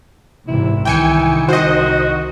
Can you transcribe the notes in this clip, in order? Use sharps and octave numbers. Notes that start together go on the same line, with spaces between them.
G#1 C3 E3 E4
C2 D#3 E3 G5 G#5 C#7
F#4 C5 D#5